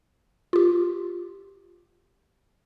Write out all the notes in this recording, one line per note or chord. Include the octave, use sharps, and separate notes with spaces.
F4 G4